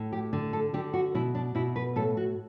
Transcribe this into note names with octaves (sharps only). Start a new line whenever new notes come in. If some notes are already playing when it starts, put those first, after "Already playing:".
Already playing: A2
G4
D3
A4
D3 G4
F#4
B2 E4
D4
B2 E4
B4
A2 A4
F#4